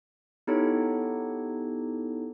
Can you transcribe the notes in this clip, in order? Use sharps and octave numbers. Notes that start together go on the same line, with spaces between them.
B3 D#4 E4 G4 A4 C#5